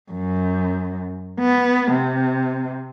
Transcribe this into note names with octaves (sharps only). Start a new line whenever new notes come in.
F#2
B3
C3